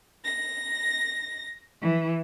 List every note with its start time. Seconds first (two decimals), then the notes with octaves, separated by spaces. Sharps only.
0.24 A#6
1.81 E3